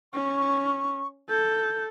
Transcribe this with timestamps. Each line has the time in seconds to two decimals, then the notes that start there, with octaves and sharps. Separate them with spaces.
0.14 C#4 C#6
1.30 A4 G6